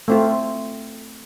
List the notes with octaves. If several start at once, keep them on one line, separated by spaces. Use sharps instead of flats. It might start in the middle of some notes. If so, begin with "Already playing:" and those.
A3 C4 F4